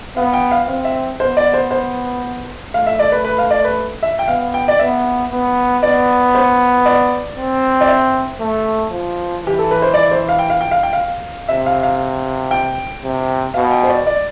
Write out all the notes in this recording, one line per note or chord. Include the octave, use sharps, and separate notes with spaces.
B3 F5
G5
F5
C4 F5
E5
B3 C5
D5
C5
C5
A3 F5
E5
D5
B4
B4
F5
D5
B4
E5
G5
B3 F5
G5
D5
B3 E5
B3
B3 D5
C5
D5
C4
D5
E5
A3
F3
E3 G4
A4
B4
C5
D5
C5
F5
G5
F5
G5
F5
G5
F5
C3 E5
F5
F5
G5
C3
B2 F5
G5
C5
D5
D5